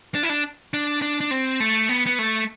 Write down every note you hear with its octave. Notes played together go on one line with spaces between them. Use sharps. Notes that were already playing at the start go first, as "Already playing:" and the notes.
D4
E4
D4
D4
D4
D4
C4
A3
B3
B3
A3